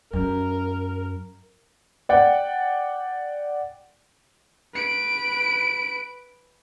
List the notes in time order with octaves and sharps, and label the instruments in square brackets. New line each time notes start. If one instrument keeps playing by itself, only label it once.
[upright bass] F#2 [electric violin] A#4
[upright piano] D5 F#5 G5
[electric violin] B4 D7